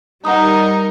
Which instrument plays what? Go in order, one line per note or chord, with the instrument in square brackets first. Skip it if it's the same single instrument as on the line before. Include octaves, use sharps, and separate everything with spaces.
[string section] G3 D#4 A#4 [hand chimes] F#5 A#5 D#6